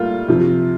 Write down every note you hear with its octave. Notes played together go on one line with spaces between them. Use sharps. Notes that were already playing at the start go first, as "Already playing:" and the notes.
Already playing: A2 G3 A3 A#3 F4
C3 F3